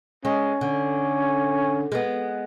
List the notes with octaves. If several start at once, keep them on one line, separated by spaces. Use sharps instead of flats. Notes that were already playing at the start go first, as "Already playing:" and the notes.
G#3 C#4
D3
G#3 B3